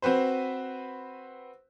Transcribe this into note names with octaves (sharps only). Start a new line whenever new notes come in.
C4 F#4 B4 C5